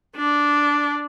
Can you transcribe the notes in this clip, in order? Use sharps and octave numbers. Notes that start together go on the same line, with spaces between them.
D4